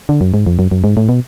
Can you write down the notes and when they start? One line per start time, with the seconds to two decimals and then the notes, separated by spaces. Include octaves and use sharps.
0.09 D3
0.21 F#2
0.34 G#2
0.46 F2
0.59 F#2
0.71 F#2
0.84 G#2
0.97 A2
1.09 B2